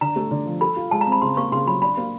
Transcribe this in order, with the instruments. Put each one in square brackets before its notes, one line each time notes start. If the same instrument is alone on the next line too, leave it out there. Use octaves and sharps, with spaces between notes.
[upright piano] D3 [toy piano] A#5
[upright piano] A3
D3
F3
[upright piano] A4 [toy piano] B5
[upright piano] F4
[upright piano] G#3 [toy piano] A5
[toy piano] A#5
[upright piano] C4
[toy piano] B5
[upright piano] C#3 [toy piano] C6
[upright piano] A#3 [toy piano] C#6
[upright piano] C#3 [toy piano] C6
[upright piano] F#3 [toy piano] B5
[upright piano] D4 [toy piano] B5
[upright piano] A#3